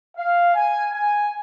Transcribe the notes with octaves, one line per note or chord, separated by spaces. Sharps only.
F5
G#5
G#5